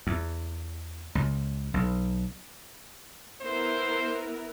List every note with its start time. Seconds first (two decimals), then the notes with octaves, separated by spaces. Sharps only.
0.07 E2
1.15 C#2
1.74 B1
3.41 B3 E4 A#4 C5